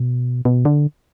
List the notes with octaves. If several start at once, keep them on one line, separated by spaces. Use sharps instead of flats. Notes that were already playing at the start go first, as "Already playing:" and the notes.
Already playing: B2
B2
D3